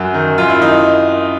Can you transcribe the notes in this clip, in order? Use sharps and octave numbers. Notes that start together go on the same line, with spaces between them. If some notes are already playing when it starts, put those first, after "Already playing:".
Already playing: F#2 F#4
D#3
F#2 F4
E4
D#3 D#4